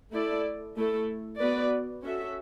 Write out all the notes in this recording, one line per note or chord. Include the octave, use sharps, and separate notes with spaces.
A3 E4 A4 D5
A3 E4 A4
B3 F#4 B4 D5
C#4 F#4 A4 E5